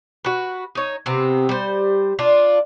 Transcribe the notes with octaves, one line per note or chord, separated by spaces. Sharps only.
F#4 B4
D#4 C#5
C3 B3 C4
G3 C5
D4 F4